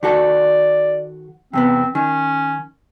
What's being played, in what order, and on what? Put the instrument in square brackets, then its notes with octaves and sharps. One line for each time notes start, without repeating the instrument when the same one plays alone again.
[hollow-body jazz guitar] D#3 F#4 A4 [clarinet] D5
[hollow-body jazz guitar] E2 C3 B3 [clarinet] C4
[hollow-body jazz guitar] D#3 [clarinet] C#4